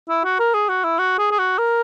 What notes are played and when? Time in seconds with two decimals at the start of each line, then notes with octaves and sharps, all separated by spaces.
0.09 E4
0.24 F#4
0.39 A#4
0.54 G#4
0.69 F#4
0.84 E4
0.99 F#4
1.19 G#4
1.31 G#4
1.39 F#4
1.58 A#4